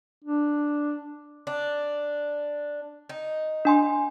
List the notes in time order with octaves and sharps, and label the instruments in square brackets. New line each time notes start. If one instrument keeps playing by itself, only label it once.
[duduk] D4
[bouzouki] D4
D#4
[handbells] D4 G#5 C6